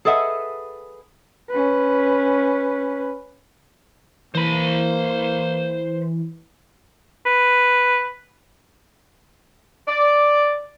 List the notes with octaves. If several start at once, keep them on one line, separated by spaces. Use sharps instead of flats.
G#4 A4 B4 D#5 E5 F#5
C#4 B4
E3 A#3 C5 B5
B4
D5